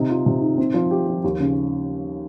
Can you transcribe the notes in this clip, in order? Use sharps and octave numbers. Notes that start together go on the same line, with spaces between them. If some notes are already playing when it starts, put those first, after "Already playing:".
Already playing: C3 D#4
F4
C3
D#3
C4
F3
G4
F3
D#2
C#3